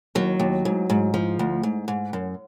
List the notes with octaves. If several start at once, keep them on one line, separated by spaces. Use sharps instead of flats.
D#2 F#3
D#2
G#2
G#2
F3
D2
G#2
G#2
F#2